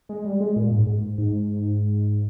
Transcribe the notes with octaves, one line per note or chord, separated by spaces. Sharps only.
G#3
G3
G#3
A#2
G#2
G#2
G#2